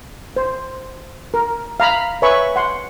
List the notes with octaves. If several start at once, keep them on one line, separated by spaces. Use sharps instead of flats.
C5
A#4
F5 A#5 B5
B4 C#5 E5 G#5 B5 C#6
F#5 C6